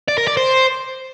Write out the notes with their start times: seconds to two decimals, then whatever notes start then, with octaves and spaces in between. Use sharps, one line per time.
0.08 D5
0.18 A#4
0.28 D5
0.37 C5